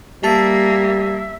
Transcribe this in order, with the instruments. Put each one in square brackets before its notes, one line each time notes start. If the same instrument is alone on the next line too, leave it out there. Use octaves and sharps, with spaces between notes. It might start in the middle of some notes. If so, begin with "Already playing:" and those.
[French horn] G3 [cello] A#3 [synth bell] G4 A5 A6 [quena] E5